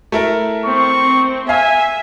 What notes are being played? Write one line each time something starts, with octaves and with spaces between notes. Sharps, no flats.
A3 E4 A#4
C4 C#6
E5 F5 G#5